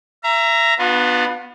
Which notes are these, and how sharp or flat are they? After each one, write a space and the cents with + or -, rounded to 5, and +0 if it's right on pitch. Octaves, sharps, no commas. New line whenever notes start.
E5 +30 A#5 +0
B3 +0 D4 +35 F4 +35